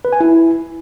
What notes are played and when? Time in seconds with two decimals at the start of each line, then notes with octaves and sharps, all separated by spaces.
0.05 B4
0.13 G#5
0.21 E4